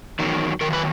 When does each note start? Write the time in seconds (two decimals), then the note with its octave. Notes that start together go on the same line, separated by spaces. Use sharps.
0.19 E2 D#3 F#3
0.61 E2 D#3 F#3 A#4
0.73 B4